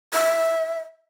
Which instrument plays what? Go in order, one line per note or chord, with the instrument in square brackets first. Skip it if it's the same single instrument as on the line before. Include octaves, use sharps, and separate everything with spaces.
[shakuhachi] E5